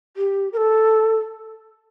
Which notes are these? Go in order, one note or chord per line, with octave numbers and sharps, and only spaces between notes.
G4
A#4
A4